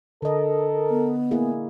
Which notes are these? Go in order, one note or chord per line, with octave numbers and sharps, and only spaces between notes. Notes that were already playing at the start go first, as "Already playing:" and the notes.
D3 A4 A#4 D#5
B3
A#3 E4 G#4